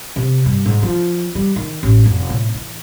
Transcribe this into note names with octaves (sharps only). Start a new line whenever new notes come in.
C3
G2
G#2
F3
G3
D#3
A1
F1
A2
E3